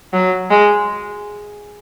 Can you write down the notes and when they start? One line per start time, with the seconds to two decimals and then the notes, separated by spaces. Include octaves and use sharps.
0.13 F#3
0.50 G#3